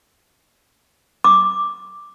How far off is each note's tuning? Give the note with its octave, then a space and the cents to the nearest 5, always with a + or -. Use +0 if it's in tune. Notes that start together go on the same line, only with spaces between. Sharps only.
D6 +5